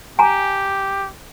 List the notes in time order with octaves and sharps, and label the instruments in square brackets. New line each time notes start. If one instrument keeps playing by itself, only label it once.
[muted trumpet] G4 [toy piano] G#5 A#5